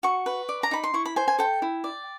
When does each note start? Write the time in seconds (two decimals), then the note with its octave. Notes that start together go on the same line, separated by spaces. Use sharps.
0.03 F#4 C#6
0.26 B4
0.49 D5
0.63 A#5
0.71 D#4 B5
0.84 C6
0.94 E4 C#6
1.05 B5
1.16 C5 G#5
1.28 G#5
1.39 A4 G5
1.62 E4
1.84 D5